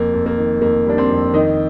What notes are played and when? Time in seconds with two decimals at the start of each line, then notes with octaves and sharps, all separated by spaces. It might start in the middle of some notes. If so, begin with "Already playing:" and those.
Already playing: F2 A#3
0.14 F2
0.26 A#3
0.38 D#3
0.61 F2 A#3
0.86 G3 D4
0.98 C4
1.10 F2
1.34 D#3 D#4